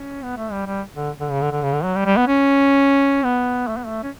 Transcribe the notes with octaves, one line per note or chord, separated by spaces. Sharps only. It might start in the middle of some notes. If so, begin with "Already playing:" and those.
Already playing: C#4
B3
A3
G3
G3
D3
D3
C#3
D3
D3
C#3
D3
F#3
G3
G3
B3
C#4
B3
A3
B3
A3
C#4